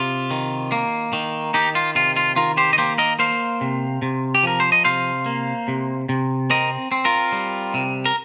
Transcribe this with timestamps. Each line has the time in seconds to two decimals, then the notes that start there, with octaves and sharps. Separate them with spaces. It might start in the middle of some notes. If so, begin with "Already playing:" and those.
Already playing: C3 F4
0.31 D#3
0.72 A#3
1.13 D#3
1.54 D#3 D#4 G4
1.75 F4
1.95 C3 F4
2.16 F4
2.36 D#3 F4 A#4
2.57 G4 C5
2.73 D#5
2.78 A#3 G4 C5
2.98 A#4 D#5
3.19 A#3 C5 F5
3.61 C3
4.02 C3
4.35 G4
4.43 F3 A#4
4.60 C5
4.72 D#5
4.85 C3 C5 F5
5.26 A#3
5.68 C3
6.09 C3
6.50 C4 A#4 D#5
6.92 C4
7.05 F4 A#4
7.33 G3
7.74 C3
8.05 A#4